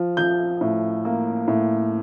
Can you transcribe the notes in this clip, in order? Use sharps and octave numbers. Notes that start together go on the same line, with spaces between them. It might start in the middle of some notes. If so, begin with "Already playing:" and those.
Already playing: F3
F3 G6
A2
A#3
A2